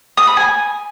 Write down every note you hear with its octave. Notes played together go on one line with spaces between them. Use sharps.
D#6
B5
G#5